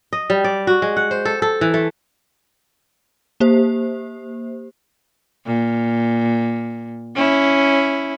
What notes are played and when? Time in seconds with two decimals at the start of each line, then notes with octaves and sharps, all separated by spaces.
0.13 D#5
0.30 G3
0.44 D5
0.67 F#4
0.82 G#3
0.97 F#5
1.11 C5
1.25 A4
1.42 A4
1.61 E3
1.74 A3
3.40 A#3 G4 C5
5.46 A#2
7.15 C#4 E4